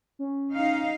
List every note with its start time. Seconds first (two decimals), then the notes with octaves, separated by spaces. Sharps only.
0.19 C#4
0.53 D#4 F5